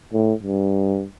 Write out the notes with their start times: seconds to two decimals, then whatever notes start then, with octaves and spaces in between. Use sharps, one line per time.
0.13 A2
0.43 G2